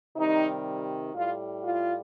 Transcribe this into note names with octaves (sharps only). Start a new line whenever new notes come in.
C3 D#3 G3 D#4
A2 G3 F4
F4